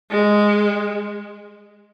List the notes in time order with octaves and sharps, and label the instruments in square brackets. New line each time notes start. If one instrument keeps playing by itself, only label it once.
[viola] G#3